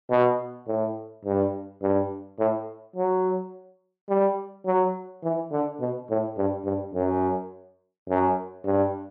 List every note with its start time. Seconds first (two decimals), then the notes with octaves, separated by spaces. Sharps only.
0.10 B2
0.68 A2
1.25 G2
1.82 G2
2.39 A2
2.96 F#3
4.09 G3
4.66 F#3
5.23 E3
5.52 D3
5.80 B2
6.10 A2
6.38 G2
6.66 G2
6.94 F#2
8.09 F#2
8.65 G2